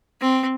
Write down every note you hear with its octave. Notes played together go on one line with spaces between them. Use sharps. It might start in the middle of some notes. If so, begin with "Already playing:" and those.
C4